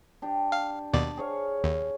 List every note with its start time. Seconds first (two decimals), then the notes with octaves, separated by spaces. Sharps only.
0.22 D4 G4
0.52 F5
0.93 D#2 B2 D5
1.17 G#4 C#5 F5
1.64 D#2